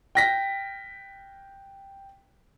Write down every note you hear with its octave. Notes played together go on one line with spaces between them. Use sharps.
G5 A#6 B6